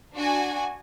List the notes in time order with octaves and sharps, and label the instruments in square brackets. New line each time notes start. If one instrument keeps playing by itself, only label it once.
[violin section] D4 F#4 G#5